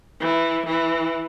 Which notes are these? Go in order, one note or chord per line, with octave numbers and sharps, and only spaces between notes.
E3
E3